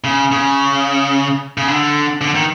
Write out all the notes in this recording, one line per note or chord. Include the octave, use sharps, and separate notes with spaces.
C#3
C#3
C#3
D3
D3
D#3